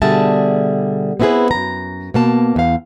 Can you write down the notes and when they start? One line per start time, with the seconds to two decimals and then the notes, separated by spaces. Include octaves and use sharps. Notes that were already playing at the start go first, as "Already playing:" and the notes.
0.02 B2 D3 G3 G#4 E5 A5
1.20 B3 C4 E4 F#4 G#4 B4
1.51 F#2 A#5
2.14 B2 A#3 A5
2.56 E2 F5